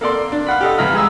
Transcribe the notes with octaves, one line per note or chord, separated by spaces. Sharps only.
A#3 A4 D5 C6
D4
F5 F#5 B5
G4 A4 D#5
G2 E3 A#5 B5 F6
G#3 G#4 E6